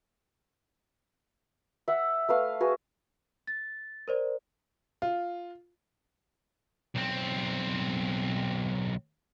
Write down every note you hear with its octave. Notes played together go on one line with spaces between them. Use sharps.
E5 F#5
A3 B4 F5
F#4 G#4 B4
A6
A#4 C5 D5
F4
B1 C4